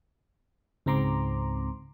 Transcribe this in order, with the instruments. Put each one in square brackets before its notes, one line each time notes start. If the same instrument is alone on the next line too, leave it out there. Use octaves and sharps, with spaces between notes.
[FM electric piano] C#2 G#2 C4 A#5 C6 D6